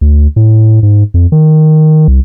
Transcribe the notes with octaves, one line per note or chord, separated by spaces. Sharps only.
D2
A2
G#2
F2
D#3
C2